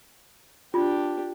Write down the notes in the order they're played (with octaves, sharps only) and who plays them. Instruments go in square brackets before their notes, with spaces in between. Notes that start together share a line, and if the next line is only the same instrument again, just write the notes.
[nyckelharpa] D4 G4 [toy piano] F4